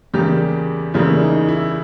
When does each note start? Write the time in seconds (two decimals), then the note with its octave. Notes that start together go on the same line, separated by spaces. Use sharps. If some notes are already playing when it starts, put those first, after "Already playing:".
0.14 E2 C#3 G3 A#3 G4
0.94 E2 C#3 G3 A#3 E4
1.21 D#4
1.49 E4